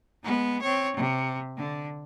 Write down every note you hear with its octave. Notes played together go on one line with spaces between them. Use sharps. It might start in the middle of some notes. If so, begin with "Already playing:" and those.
G#3 B3
C4 C#5
C3
D3